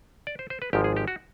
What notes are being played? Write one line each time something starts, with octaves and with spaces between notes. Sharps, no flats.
D5
C5
C5
B4
G#1 G#2 F3 G4
G#4
G4
F#4